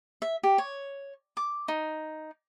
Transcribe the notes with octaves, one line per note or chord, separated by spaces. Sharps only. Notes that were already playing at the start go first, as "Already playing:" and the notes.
E5
G4
C#5
D6
D#4